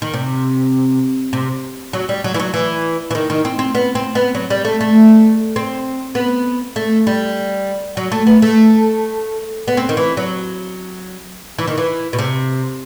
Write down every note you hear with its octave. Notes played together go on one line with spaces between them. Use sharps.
D#3
C3
C3
F#3
G3
F#3
E3
F#3
E3
E3
D#3
D#3
C4
C4
B3
C4
B3
F#3
G3
A3
A3
C4
B3
A3
G3
F#3
A3
B3
A3
B3
C4
D#3
E3
F#3
E3
D#3
E3
B2
C3